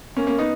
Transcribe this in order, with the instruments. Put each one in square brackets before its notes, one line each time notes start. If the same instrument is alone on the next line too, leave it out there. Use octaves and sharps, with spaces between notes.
[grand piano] A#3 C#4
A#3 C#4
B3 D#4